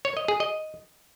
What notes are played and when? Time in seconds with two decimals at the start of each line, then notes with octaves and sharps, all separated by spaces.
0.05 C#5
0.17 D#5
0.28 G#4
0.40 D#5